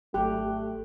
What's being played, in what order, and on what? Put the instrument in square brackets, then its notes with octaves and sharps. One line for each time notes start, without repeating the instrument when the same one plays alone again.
[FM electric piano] G#1 F#3 F#6 [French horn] A3 [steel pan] G4